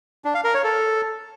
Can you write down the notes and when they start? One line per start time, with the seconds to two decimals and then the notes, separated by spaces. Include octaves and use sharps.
0.25 D4
0.35 F5
0.44 A#4
0.54 C#5
0.64 A4